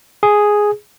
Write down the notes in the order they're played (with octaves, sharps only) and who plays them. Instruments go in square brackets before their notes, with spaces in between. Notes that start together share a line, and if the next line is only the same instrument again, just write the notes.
[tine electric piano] G#4